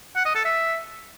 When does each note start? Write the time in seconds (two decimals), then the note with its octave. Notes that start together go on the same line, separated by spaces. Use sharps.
0.16 F#5
0.26 D#5
0.35 A4
0.45 E5